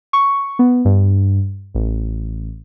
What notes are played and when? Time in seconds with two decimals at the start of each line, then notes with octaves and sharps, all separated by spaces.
0.13 C#6
0.59 B3
0.85 G2
1.75 A1